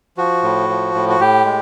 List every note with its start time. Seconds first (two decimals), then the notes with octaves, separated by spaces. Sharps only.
0.17 F3 F#4
0.43 A2
0.69 F3
0.95 A2
1.09 F#4
1.19 A2 G4
1.45 G#3